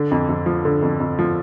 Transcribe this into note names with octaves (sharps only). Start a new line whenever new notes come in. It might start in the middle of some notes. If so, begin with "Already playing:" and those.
Already playing: D3
F2
F2
F3
D3
F2
F2
F3